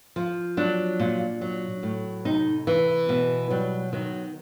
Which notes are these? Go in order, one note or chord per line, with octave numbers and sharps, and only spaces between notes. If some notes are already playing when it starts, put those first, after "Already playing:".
F3
F#3 D4
A#2
F#3
A2
C3 D#4
E3
B2
F#3 G3
D#3 F#3